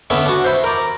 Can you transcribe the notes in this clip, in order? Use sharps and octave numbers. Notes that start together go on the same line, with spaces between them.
D3 B3 C#4 E5
D4 F#4
E4 C5
A#4 D5